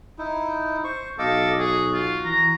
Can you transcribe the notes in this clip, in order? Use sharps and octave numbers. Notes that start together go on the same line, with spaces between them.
D#4 E4
C5 C#6
B1 A4 D#5 F5 D6
F#4 G#4
F4
E3 A#5